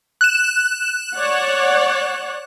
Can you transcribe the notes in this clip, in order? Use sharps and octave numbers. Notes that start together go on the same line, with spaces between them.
F#6 E7
C#5 D5 F#5